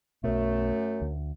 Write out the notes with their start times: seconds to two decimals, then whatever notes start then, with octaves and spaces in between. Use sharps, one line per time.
0.23 B1 F#2 B2 A3
1.01 D2